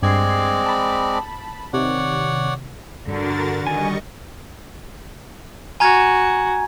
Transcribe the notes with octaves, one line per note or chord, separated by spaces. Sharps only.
G2 G#3 C4 D5 G#6 C7
A5 B5
C3 D#3 C#5 D5 F#5
G2 D3 G3 F#4 A#4 A6
D#3 G3 D#5 G#5 C#6
F#4 G#5 A#5 G#6